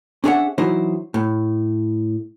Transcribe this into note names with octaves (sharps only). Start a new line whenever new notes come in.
C#4 D4 G#4 A#4 E5 F#5
E3 F#3 D#4 E4 C5
A2